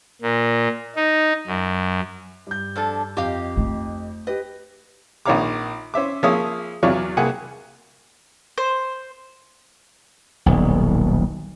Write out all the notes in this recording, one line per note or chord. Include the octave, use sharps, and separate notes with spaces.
A#2
D#4
F#2
G2 G6
F2 D4 A4
F2 G4 D#5 F5
A3 D#4
G4 B4 D#5
A#1 D#3 C#5 F5 A#5 D6
C#4 C5 E5 D6
F3 A#3 G#4 C#5 E5 D#6
E2 F#3 C#5 D5 F5 C#6
C2 A#3 G#4 F#5 G#5
C5
D#1 B1